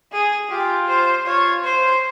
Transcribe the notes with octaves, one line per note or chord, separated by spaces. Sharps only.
G#4
F4 G4
C5
F4 C#5
C5